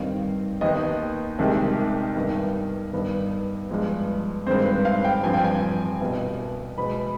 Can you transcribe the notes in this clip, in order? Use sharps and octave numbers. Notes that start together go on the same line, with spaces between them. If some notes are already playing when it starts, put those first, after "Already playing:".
Already playing: G2 D#3 G3 C4 F5
D#2 D#3 B3 D#5
C2 C3 D#3 G#3
G2 D#3 B3
G2 D#3 B3
G2 F3 G#3 B3
G2 D#3 G#3 C4 C5
B4
F5
G5
G2 F3 C4 G#5
G5
G#5
C2 B2 B3
B2 G#3 B3 B5